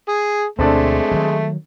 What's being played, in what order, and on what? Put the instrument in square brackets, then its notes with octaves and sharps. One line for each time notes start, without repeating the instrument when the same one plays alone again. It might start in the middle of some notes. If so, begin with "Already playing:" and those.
[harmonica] G#4
[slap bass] D2 B2 [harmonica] G#3 A3 [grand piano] C4 D4 A4
[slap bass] D#3 F#3